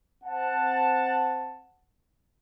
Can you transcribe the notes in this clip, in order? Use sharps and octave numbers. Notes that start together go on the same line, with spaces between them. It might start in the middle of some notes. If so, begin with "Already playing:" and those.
C4 F#5 A5